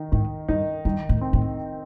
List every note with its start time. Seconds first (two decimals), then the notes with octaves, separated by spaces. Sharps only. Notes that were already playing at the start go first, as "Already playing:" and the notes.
Already playing: D#3 D#4
0.12 G#2 D#3
0.48 G2 D#4
0.85 G2 D#3
1.09 A2
1.21 C4
1.33 A2